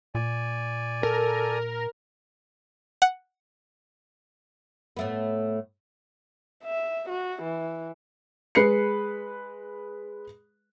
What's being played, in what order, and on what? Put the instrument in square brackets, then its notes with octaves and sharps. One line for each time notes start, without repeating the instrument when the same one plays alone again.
[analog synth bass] A#2 [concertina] D5 G#5
[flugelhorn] A4 [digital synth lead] A#4
[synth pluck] F#5
[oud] A2 A3 B3
[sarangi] E5
F#4
E3
[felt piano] G#3 B4 C7 C#7